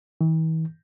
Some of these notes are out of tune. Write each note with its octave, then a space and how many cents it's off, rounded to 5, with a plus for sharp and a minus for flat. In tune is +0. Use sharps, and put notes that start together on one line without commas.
E3 -45